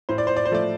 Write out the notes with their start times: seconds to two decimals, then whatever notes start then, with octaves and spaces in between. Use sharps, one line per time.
0.09 A2 C5
0.18 D5
0.27 C5
0.37 D5
0.45 C5
0.51 F3 A3 D5